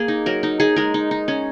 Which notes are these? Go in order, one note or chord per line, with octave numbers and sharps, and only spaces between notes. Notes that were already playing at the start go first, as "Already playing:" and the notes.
Already playing: A#3 G#4
D#4
F#3 A#4
D#4
D#4 G#4
G#3 A#4
D#4
D#4
C#4